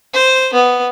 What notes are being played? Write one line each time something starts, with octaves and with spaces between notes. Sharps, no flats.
C5
B3